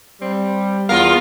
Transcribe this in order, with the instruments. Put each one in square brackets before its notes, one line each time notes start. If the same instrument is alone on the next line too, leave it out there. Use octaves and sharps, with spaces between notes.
[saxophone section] G3 [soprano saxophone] C4
[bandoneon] E2 B3 [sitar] F4 A#4 [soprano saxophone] F5